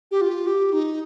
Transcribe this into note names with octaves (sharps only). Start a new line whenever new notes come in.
G4
F4
G4
D#4